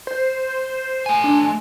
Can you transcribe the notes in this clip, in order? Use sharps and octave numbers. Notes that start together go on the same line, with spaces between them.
C5
A3 G#5
D4